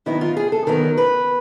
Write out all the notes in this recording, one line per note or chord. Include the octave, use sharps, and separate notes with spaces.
D#3 F#3 B3 D#4 E4
F4
G#4
A4
D#3 F#3 B3 D#4 A#4
B4